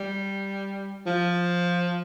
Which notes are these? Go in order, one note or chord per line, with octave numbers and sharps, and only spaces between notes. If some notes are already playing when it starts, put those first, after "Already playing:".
Already playing: G3
F3